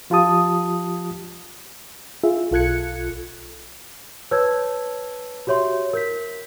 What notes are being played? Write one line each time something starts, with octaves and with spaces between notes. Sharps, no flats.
F3 F4 G4 A5 D#6
F4 G#4 E5
B1 F4 A4 F#6 G#6 C#7
B4 C#5 A5 E6 F6 G#6
F#4 G4 C#5 E5 C6
A#4 G6 B6